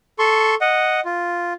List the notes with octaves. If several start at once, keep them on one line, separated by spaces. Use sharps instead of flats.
A4 C6 C#6
D#5 F#5
F4